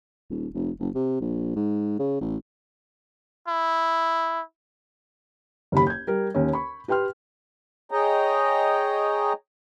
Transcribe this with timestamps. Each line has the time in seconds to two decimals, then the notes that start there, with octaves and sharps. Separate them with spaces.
0.30 D#1
0.55 F1
0.80 F#1
0.95 C3
1.21 A#1
1.56 G#2
1.99 C#3
2.21 A1
3.48 E4
5.72 F#1 D#2 G4 B5
5.87 G6 G#6
6.07 G3 A#4
6.35 D#2 C#4
6.53 B5 C#6
6.88 G4 B4 G5 C6 F6
7.91 G#4 C#5 D#5 G5 A#5